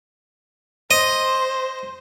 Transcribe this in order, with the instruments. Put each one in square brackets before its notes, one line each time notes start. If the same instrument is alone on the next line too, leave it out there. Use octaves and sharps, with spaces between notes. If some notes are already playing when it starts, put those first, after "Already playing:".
[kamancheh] C5 [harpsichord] D#5